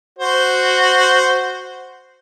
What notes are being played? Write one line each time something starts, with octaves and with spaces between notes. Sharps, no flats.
F#4 C5